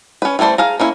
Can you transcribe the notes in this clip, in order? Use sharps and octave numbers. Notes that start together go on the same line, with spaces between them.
C#4 B4
E3 G3 A3 C5 D5
G#4 F5 A#5
A#3 C#4 E4